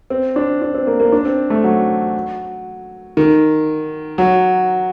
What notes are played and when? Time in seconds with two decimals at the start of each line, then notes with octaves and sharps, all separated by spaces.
0.10 C4
0.36 D4
0.62 D4
0.74 C4
0.87 A#3
1.00 A#3
1.12 D4
1.25 C4
1.50 A3
1.64 F#3
3.17 D#3
4.18 F#3